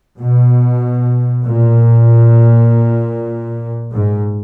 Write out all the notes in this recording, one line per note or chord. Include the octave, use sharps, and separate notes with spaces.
B2
A#2
G#2